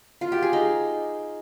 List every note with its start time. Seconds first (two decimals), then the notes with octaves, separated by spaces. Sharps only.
0.21 F4
0.32 G4
0.42 G#4
0.53 D#4